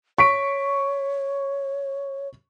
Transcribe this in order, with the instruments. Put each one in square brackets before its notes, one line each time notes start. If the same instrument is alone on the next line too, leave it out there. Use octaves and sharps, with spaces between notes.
[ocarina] C#5 [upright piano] C#6 B6 D7